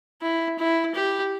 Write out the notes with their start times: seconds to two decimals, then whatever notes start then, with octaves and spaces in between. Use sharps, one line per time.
0.22 E4
0.59 E4
0.95 G4